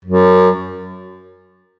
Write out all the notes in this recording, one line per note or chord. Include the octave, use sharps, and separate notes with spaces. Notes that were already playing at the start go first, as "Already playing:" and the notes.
F#2